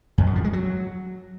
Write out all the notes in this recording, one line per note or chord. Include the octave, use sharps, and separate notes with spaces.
F2
F#2
F3
G#3
F#3